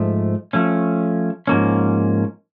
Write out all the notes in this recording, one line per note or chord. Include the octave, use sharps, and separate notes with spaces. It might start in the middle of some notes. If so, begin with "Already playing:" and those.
Already playing: G#2 F3 A3
F3 A3 C#4
G#2 F3 A#3 C#4